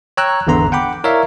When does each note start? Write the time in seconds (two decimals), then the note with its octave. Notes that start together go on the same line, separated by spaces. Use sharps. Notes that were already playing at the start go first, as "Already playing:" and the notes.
0.17 C#5 G5 A#5 E6 F#6
0.47 G#1 E2 D3 B3 A#5 C6
0.72 F#5 G5 B5 D6
1.04 E4 A#4 C#5 D5 E5 F5